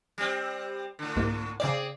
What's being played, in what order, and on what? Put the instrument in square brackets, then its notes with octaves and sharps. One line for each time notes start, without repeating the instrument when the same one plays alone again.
[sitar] G3 C4
A2 D3
[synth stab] C2 G#2 A#3
[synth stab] C#3 D5 [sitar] C4 E4 G#4